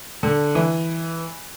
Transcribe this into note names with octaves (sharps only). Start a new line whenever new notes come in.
D3
E3